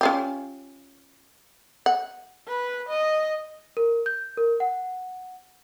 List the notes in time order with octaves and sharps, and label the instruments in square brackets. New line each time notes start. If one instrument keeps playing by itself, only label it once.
[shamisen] C#4 F4 G4
F#5
[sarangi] B4
D#5
[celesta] A#4
G6
A#4
F#5